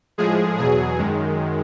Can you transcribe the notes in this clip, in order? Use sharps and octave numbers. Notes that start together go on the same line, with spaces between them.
A2 F3 G#3 G#4
E2 B2 F#3 G#4
F#2 D#3 G#3